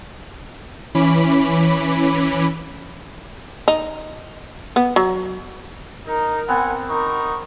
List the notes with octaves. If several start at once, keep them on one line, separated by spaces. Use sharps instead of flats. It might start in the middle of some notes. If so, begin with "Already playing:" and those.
E3 C#4 B5 D6
D#4
B3
F#3
D#4 A#4
B3 C4 F#5 G#5
D#4 A#4 C#6